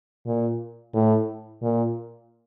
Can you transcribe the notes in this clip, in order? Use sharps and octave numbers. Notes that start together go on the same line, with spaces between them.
A#2
A2
A#2